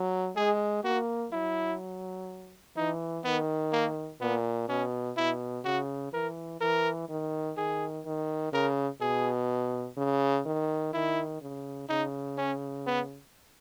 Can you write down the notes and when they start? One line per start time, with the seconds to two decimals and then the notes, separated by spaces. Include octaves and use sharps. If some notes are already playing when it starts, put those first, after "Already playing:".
Already playing: F#3
0.36 G#3 G#4
0.84 A#3 F#4
1.32 F#3 E4
2.76 E3 D#4
3.24 D#3 B3
3.72 A#3
4.21 A#2 B3
4.69 B2 C#4
5.17 B2 E4
5.65 C#3 F#4
6.13 E3 A#4
6.61 E3 A#4
7.09 D#3
7.57 D#3 G#4
8.05 D#3
8.53 C#3 A#4
9.01 B2 G#4
9.97 C#3
10.46 D#3
10.93 D#3 E4
11.42 C#3
11.89 C#3 D#4
12.38 C#4
12.86 B3